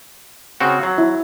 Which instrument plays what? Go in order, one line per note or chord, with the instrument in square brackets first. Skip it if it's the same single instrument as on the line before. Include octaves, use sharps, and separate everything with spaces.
[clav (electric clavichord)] C#3 C4 F#4
F#3
[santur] E4